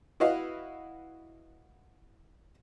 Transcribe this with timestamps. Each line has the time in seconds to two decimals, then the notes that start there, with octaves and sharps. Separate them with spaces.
0.20 E4 F#4 B4 D#5 F5